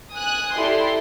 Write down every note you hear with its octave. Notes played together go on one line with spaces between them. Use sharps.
G#5 D#6 F#6
E4 G4 A4 D5 C6